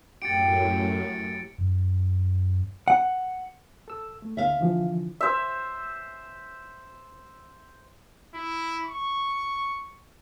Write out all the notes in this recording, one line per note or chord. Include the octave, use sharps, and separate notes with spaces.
F#2 A2 G4 A6 C#7 D7
F#2
F#5
A4 E6
A3
D2 E5 F5
D3 E3 F3
C5 E5
E4
C#6